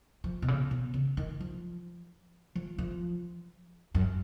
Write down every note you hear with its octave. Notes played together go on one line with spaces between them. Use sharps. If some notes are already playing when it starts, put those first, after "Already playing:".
F3
B2
C#3
B2
C#3
D#3
F3
F3
F3
F#2